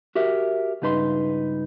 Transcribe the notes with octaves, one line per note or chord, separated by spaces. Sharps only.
F#4 G4 A#4 E5
C#2 G2 D#4 B4 B5 C6